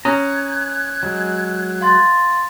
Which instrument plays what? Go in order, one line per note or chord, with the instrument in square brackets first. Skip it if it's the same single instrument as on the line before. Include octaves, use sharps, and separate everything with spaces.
[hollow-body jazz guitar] C#4 [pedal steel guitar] A#5 [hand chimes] D#6 [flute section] F#6 G#6
[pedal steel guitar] F#3 G#3
[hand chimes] F5 C6 A6